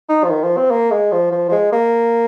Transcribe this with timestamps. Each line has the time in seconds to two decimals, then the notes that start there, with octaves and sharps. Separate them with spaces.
0.09 D#4
0.24 F3
0.30 D#3
0.43 F3
0.57 C4
0.70 A#3
0.91 G#3
1.12 F3
1.32 F3
1.49 F3
1.52 G#3
1.72 A#3